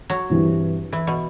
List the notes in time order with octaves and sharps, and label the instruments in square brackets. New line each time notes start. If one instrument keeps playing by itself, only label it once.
[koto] F#3
[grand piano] G2 E3 G3 C4 G4
[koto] E3
B2